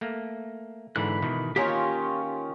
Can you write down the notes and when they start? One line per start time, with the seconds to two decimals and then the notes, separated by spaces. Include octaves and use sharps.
0.01 A3 A#3
0.96 G#2 D3 E3 B5 F#6
1.22 B2 D#3 E3
1.56 D#3 A#3 C#4 F4 G4 A#4 C#5